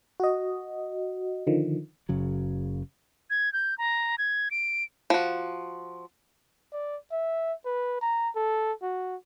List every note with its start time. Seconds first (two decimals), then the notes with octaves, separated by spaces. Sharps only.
0.20 F#4 D#5
1.47 D3 D#3 F3
2.09 F#1 C#3 F#3
3.30 G#6
3.53 G6
3.78 A#5
4.18 G#6
4.51 D7
5.10 F3 F#4
6.73 D5
7.12 E5
7.65 B4
8.01 A#5
8.35 A4
8.82 F#4